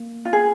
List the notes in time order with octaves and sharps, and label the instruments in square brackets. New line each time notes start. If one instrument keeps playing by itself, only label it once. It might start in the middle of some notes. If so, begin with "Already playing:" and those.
Already playing: [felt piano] A#3
[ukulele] F4
G#4